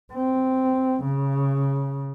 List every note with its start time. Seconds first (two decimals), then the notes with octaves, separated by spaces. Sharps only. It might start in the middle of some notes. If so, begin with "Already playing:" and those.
0.13 C4
1.03 C#3